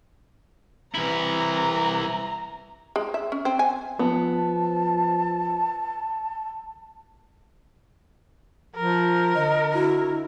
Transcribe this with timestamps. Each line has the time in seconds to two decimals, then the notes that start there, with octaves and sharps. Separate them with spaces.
0.95 C2 E3 E4 A#5
2.96 G#3
3.14 E5
3.32 C#4
3.45 C4
3.59 G#5
3.99 F3 B3 A5
8.76 F3 A#4
9.35 D3 D#5
9.73 E4 F#4